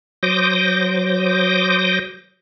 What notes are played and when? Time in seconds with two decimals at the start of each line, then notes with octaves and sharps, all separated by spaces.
0.23 F#3 C5 D6 D#6 G6 A#6